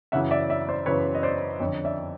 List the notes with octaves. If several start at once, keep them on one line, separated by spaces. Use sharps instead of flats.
F#2 C#3 E3 E5 F#5
D5 E5
D5 E5
C5 D5
F#2 C#3 E3 B4 C#5
D#5
C5 D5
F2 D3 C#5 D#5
D5 E5